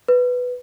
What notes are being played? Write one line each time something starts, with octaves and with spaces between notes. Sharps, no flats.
B4